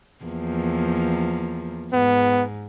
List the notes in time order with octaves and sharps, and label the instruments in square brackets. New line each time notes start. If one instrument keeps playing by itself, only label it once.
[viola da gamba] E2 F3 A#3
[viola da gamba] G#2 [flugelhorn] B3